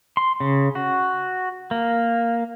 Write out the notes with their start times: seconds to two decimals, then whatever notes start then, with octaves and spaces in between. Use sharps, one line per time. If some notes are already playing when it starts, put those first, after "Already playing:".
0.17 C6
0.40 C#3
0.75 F#4
1.71 A#3